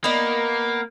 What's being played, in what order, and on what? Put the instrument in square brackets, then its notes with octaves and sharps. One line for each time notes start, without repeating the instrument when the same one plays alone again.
[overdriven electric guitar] A#3 [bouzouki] B3 D#4